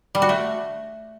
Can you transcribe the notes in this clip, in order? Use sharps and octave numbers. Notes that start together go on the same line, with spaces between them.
G3
F#4
A3